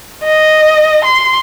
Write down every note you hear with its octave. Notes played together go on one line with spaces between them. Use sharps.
D#5
C6